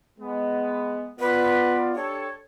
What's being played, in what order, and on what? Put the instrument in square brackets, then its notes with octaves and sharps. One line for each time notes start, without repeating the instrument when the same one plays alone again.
[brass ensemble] G#3 B3
[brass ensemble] B3 F4 D5 [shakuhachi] B4
[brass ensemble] D4 G4 A4 [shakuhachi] C#5